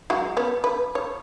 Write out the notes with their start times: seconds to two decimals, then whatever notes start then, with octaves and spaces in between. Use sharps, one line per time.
0.10 F#3 G#3 F#4
0.37 B3 C#4
0.64 B4
0.95 C#5